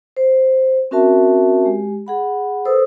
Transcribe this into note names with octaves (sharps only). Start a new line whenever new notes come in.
C5
C4 C#4 F#4 A#4 E5 A5
G#3 G4
G#4 F#5 B5
A4 B4 C5 D#6 E6